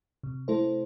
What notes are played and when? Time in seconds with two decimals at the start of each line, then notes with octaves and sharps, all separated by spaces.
0.23 C3
0.48 A3 E4 A4 C5